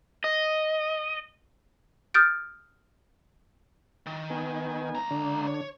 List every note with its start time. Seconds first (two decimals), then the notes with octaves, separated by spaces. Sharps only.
0.24 D#5
2.14 D#6 F6 G6 A6 D7
4.06 D#3
4.30 B3 D#4 G#5
4.95 C#2 A#5
5.11 D3 D4
5.47 C#5